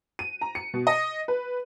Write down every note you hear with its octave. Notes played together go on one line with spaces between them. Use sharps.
D#7
A#5
C#7
B2
D#5
B4